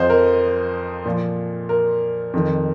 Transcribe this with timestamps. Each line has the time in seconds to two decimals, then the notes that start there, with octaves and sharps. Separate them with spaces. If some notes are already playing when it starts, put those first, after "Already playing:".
Already playing: F2 F3 C5 D#5
0.10 A#4
1.05 A#2 F3
1.69 A#4
2.34 F2 D#3